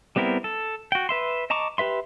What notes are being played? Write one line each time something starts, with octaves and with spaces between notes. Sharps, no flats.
G3 B3 C4 E4 A#4
A4
F#4 G5
B4 E5 C6
D#5 A5 A#5 C#6 D6
G4 B4 E5 C6